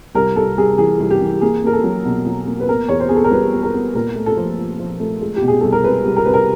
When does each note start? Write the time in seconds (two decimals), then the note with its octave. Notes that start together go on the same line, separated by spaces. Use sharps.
0.15 C2 A#4
0.36 C2 A4
0.57 C2 G#4
0.78 E3 G#4
1.00 C2
1.10 G4
1.20 E3
1.41 A#3 G#4
1.63 A#3 A#4
1.73 A4
1.84 F#3
2.05 B2
2.26 F#3
2.48 A#3
2.60 B4
2.69 B3 A#4
2.89 E2 C#5
3.00 C5
3.09 B3 G#4
3.16 A4
3.24 A#4
3.31 G3 B4
3.53 B3
3.63 A#4
3.74 B3
3.95 A#2 A#4
4.16 A3
4.26 A4
4.37 F3
4.59 F3
4.80 F3
5.00 A3
5.21 G#3
5.36 G4
5.42 B2
5.48 G#4
5.61 C2 A4
5.72 A#4
5.84 G#3 B4
6.06 C2
6.16 A#4
6.25 C2 B4
6.34 A#4